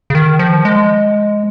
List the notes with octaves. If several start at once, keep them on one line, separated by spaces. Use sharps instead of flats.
C#3
D#3
F3
G#3